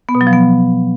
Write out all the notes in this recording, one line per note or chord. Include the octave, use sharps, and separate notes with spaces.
B3
B2
F#3
F3
B3